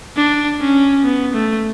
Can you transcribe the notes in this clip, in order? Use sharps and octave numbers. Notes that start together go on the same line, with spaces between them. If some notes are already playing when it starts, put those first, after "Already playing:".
D4
C#4
B3
A3